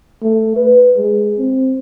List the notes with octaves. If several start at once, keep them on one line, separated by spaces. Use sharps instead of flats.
A3
B4
G#3
C4